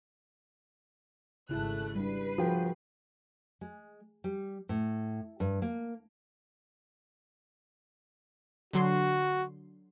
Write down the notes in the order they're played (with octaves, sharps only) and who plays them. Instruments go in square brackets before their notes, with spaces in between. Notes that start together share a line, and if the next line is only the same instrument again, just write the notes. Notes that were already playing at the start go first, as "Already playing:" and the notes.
[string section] G#1 A3 F#6 [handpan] C#3 E4 G#4
[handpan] G3 D4 [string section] B4 C7
[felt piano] F3 G5 [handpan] F#4 G#4 A#4
[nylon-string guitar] G#3
G3
A2
G2
A#3
[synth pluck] D3 F#3 C6 [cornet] F#4